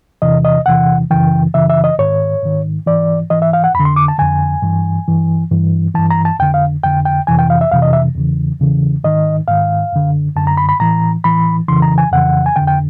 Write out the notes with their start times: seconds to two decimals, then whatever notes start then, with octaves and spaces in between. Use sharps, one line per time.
0.22 E2 C3 E3 D#5
0.45 D#5
0.66 E2 C3 E3 F#5
1.11 F#2 C#3 E3 G5
1.54 F#2 C#3 E3 E5
1.69 E5
1.84 D#5
1.98 G#2 D#3 C#5
2.43 G#2 D#3
2.86 G#2 E3 D5
3.30 G#2 E3 D#5
3.42 E5
3.53 F5
3.64 F#5
3.74 F2 B5
3.80 D3
3.85 C6
3.96 D6
4.08 A5
4.18 F2 D3 G#5
4.62 G2 E3
5.08 G2 E3
5.51 G2 E3
5.95 G2 E3 A5
6.11 A#5
6.25 A5
6.39 F2 D3 G5
6.54 F5
6.83 F2 D3 G5
7.05 G5
7.27 F2 C3 E3 G#5
7.39 G5
7.50 F5
7.61 E5
7.72 F2 C3 E3 F5
7.82 D#5
7.93 E5
8.15 E2 C#3 E3
8.60 E2 C#3 E3
9.04 G#2 D#3 D#5
9.48 G#2 D#3 F5
9.93 F#2 D3
10.36 F#2 D3 A5
10.47 A#5
10.57 B5
10.69 B5
10.80 A2 E3 A#5
11.24 A2 E3 B5
11.68 F2 C#3 E3 C6
11.82 A#5
11.98 G#5
12.12 F2 C#3 E3 F#5
12.46 G#5
12.56 F2 D3 G5
12.67 G5